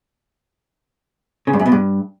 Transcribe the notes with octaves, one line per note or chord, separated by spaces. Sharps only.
C#3
G2
F#2
B2
G2